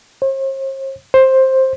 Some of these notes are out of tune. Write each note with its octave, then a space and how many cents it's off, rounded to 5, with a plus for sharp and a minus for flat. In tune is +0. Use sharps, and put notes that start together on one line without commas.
C5 +45
C5 +10